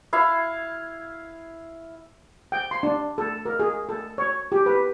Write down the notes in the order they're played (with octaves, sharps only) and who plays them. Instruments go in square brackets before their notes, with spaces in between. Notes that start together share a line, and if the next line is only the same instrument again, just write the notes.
[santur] E4 F5
[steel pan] G5
C6
D4
A4
A#4
G#4
A4
C#5
G4
B4